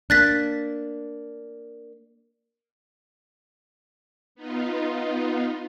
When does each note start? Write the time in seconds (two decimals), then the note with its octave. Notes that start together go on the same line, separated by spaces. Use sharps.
0.10 A#3 D4 F#6 A6 B6
4.35 B3 D#4 F4